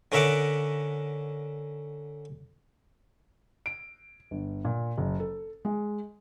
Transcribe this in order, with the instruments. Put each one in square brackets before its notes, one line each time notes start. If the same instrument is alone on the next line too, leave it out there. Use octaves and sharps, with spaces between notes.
[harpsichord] D3 C#4 A#4 E5 F#5 D6
[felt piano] D7
G1
A#2
F#1
A4
G#3